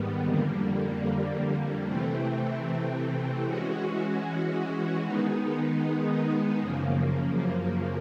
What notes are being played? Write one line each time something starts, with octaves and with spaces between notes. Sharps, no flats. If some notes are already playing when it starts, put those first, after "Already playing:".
Already playing: G#2 D#3 G3 B3
F2 D3 G3 A#3
C3 E3 A3 C4
E3 G#3 C#4 F#4
D#3 G#3 B3 D#4
F#2 C#3 F3 A#3